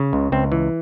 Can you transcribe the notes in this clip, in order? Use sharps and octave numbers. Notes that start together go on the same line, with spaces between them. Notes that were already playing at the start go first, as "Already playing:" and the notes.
Already playing: C#3
C#2
C#2 C4
E3